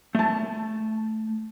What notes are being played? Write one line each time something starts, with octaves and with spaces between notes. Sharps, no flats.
A3 A5